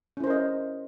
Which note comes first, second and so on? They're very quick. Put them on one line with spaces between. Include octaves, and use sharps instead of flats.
C#4 E4 C5 A#4 D#5